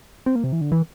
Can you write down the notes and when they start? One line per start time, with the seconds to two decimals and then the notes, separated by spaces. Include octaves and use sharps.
0.26 C4
0.35 A#3
0.44 C3
0.52 E3
0.61 D3
0.72 E3